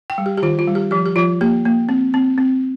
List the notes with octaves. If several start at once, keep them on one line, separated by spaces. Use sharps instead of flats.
G5
G3
G4
G4
D#3 F4
F4
G3
G4
F3 G4
G4
F3 F4
A#3 G4
A#3
C4
C4
C4